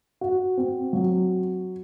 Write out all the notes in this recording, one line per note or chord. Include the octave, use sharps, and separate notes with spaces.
F#4
C4
F#3